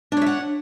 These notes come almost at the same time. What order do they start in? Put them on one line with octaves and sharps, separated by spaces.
D4 C#5 E5 F#5